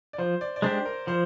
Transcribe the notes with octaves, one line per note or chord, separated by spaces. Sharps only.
D5
F3 C5
D5
D5
G#3 D4 G4 C5
A#4
F3 C5